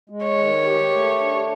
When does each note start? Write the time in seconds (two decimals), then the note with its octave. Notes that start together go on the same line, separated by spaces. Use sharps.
0.10 G#3
0.24 C#5
0.38 D#3
0.64 G4
0.92 A3
1.20 D4